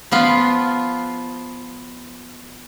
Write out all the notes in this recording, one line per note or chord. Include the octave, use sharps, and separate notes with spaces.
F3 B3 F4